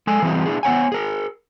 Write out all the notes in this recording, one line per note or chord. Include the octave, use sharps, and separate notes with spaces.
G#3 A4 G#5
E3 G3 C4 F#4 G#4 C5
D4 E4 G#4
B3 C5 C#5 F#5 G#5
G#4 A#4